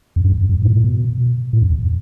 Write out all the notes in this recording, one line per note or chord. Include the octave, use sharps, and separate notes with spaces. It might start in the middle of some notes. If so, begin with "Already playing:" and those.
F2
G2
F2
G2
A2
A2
B2
A2
F2
E2